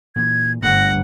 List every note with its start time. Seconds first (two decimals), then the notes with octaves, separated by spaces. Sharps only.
0.16 A#2 E3 G#6
0.63 G1 G2 A3 F#5 A#6